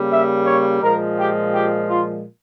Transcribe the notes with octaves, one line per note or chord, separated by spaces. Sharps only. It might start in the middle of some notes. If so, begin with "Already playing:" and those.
Already playing: C#3 G3 A#3
E5
C#5
A#2 F3 G#3 A#4
G4
G4
F4